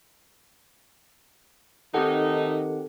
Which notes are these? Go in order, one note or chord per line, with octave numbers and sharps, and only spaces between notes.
D#3 A3 C4 D#4 G4 A4 F#5